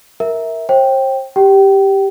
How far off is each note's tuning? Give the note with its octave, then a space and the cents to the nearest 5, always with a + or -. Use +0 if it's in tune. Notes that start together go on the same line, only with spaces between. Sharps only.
A#4 +0 E5 -15
C5 +40 G5 +0
G4 +0 G5 -30